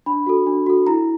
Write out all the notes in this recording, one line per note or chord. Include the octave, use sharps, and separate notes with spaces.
D4 B5
F#4 A4
D4
F#4 A4
E4 A#5